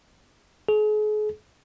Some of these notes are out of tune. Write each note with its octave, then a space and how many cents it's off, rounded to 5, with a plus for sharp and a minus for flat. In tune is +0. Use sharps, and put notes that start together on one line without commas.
G#4 +40